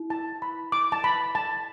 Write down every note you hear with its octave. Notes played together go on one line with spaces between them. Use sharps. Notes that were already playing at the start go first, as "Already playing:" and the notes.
Already playing: E4
A5
B5
D6
A5
B5
A5